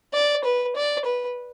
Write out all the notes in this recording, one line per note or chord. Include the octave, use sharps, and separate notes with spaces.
D5
B4
D5
B4